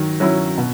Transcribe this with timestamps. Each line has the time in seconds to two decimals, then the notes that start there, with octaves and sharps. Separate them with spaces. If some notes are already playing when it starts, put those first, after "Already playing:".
Already playing: D#3 F#3
0.20 F#3 C#4 E4
0.58 B2